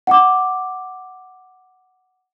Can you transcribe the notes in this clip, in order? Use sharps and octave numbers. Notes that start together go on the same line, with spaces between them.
F#5 D6